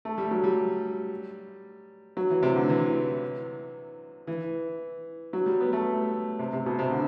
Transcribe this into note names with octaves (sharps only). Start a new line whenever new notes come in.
A3
G3
F#3
G3
F#3
E3
C3
D3
E3
E3
F#3
G3
B3
A3
C3
C3
B2
C3
D3